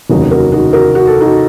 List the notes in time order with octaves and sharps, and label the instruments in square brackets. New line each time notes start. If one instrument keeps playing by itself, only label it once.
[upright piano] F1 D#2 C#3 F#3 [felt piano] D#4 F#4
[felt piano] F#4 A#4
D#4 F#4
F#4 A#4
F#4
A4
D#4 F#4